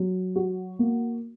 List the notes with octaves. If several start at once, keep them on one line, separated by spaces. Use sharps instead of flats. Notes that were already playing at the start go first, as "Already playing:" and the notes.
Already playing: F#3
F#4
A#3